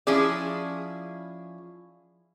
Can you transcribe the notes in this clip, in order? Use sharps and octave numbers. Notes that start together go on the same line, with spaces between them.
F3 C#4 E4 G#4 D5